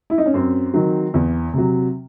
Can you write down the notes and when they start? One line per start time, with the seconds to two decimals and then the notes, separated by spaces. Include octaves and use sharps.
0.10 E4
0.18 D#4
0.26 C#4
0.34 F#2 C4
0.74 D#3 F#3
1.14 E2
1.53 C3 F#3